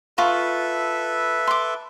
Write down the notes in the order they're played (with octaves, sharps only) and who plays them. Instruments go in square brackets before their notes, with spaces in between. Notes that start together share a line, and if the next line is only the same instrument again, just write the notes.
[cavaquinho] F4 B5 C#6 [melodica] A4 B4 E5
[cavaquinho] C6 D6